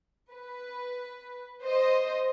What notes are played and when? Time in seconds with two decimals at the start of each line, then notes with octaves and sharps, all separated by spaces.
0.33 B4
1.64 C5 D#5